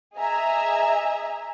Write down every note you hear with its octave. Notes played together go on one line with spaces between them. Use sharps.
G#4 D#5 E5 G#5 A#5